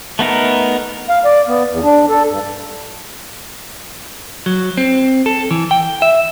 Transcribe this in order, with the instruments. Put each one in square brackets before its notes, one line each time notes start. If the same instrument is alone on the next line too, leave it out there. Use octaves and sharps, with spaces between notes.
[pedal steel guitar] A3 B3 D#4 A#4
[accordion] F5
D5
B3
E2
D4
A4
G2
[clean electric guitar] F#3
C4
A4
E3
G5
E5